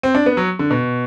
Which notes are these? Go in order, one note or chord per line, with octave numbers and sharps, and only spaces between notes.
C4
D4
B3
F#3
D3
B2